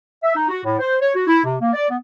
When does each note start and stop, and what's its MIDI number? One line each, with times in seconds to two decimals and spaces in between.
0.23 0.34 76
0.35 0.46 63
0.49 0.61 66
0.64 0.75 45
0.78 0.95 72
1.01 1.10 73
1.15 1.26 66
1.27 1.43 64
1.43 1.55 48
1.61 1.71 58
1.73 1.89 74
1.89 1.96 59